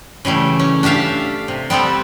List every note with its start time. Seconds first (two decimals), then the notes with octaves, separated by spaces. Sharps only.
0.25 C#3 E3 G3 A3
0.59 C#4
0.83 D4 G4 E5 F5 A5
1.48 C3
1.70 G3 B3 C4 A4